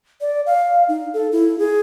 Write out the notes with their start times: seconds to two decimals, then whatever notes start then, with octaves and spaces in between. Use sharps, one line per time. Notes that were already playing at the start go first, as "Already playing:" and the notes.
0.21 D5
0.46 F5
0.88 D#4
1.14 A4
1.32 E4
1.59 G#4